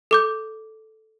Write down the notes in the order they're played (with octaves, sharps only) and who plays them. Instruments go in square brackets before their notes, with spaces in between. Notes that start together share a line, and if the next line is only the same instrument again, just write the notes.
[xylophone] A4 D6 G6